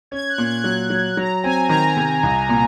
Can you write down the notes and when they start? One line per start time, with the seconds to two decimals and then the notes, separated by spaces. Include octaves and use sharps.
0.11 C#4 G#6
0.29 F#6
0.38 A#2
0.46 G#6
0.64 F#3 F#6
0.90 F#3
1.17 F#3 A#5
1.44 C4 G#5
1.69 D#3 A#5
1.97 C3
2.23 C2
2.49 A#2